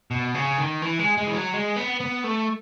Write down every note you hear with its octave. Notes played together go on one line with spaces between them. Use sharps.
B2
C#3
D#3
E3
G#3
G#3
E3
F#3
G#3
B3
B3
A3